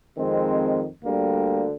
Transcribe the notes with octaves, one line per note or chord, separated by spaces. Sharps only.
F2 D#3 G#3 C4
D2 D3 G3 A#3